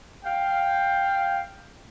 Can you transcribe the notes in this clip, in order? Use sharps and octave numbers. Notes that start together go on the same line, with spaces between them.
F5 G5